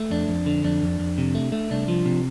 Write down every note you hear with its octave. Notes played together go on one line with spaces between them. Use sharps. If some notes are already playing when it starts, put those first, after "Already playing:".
Already playing: A3
F2 D4
F2
D3
F2 D4
F2
F2
C3
A3
A3
C2 D4
F3
C3